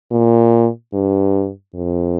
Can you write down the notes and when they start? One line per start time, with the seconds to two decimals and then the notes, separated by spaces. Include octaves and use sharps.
0.11 A#2
0.93 G2
1.75 F2